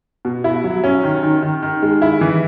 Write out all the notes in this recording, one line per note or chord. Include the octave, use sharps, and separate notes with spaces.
B2
E4
F#3
C#4
D#3
D#3
D#3
D#3
G#3
E4
E3